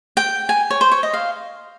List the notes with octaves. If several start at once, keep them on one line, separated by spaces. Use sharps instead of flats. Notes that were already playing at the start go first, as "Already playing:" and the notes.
G5
G#5
C#5
C5
C#5
D#5
F5